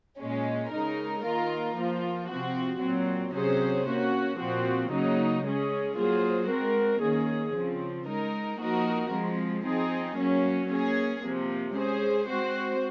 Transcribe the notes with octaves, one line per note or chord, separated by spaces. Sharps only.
A#2 G#3 C#4
C#3 G#3 D#4 A#4
D#3 A#3 F4 A#4
F3 A#3 F4
C3 F3 C4 F#4
A#2 F#3 C4
C3 F#3 C#4 G#4 C5
A#3 C#4 F#4
A#2 F3 C4 F#4
C#3 F#3 A#3 D#4
G#3 C#4 G#4
F#3 A#3 F4 G#4 C5
G#3 C4 F#4 A#4
D#3 A#3 C#4 G#4
C#3 F3 C4
G#3 D#4 A#4
F3 A#3 D#4 F#4 A#4
F3 G#3 C4
F3 C4 D#4 G#4
F#3 A#3 C#4
A#3 C#4 G#4
C3 F3 A#3
G#3 C#4 G#4 C5
G#3 C4 F#4 C5